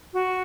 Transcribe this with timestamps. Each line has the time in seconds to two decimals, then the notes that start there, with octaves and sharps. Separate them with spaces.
0.13 F#4